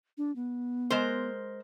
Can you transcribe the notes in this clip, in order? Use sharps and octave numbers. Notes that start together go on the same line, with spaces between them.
D4
B3
G#3 A#4 C5